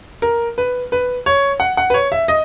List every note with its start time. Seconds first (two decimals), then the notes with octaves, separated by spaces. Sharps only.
0.22 A#4
0.58 B4
0.92 B4
1.26 C#5
1.60 F#5
1.77 F#5
1.90 B4
1.94 C#5
2.12 E5
2.28 D#5